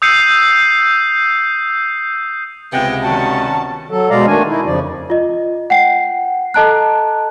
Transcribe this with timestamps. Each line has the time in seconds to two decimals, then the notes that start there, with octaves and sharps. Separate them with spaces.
0.02 D#6 E6 G6 C7 C#7 D#7
2.72 C#2 C3 G#3 B3 G5
3.04 B2 D#3 G3 C#4 F#4 A5
3.91 F#3 A4
4.10 B2 G#3 D5 F5 A#5
4.27 D#3 A3 D4 G#5
4.48 D#4 E4
4.66 F2 C#3 F3 D5
5.10 F4 D#5
5.70 F#5 G5 C7
6.54 A4 D#5 A5 A#5 F#6